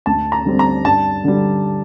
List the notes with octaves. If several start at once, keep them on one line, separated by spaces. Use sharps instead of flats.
D2 A5
A#5
D3 G3 C4
A#5
G2 A5
D3 G3